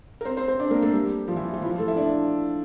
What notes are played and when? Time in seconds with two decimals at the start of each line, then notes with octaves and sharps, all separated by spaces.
0.21 A#4
0.25 C4 C5
0.37 C4 C5
0.48 C4 C5
0.60 D4 D5
0.71 A#3 A#4
0.82 A3 A4
0.93 G3 G4
1.28 F3 F4
1.36 E3 E4
1.53 F3 F4
1.62 E3 E4
1.70 F3 F4
1.79 A3 A4
1.88 E4 E5
1.96 D4 D5